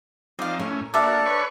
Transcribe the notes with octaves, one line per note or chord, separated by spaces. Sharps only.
F3 C4 D#4 D5 F5
A2 C#4 A#4
A#3 D4 F#4 A4 D5 E5 D6
B4 C#5 C#6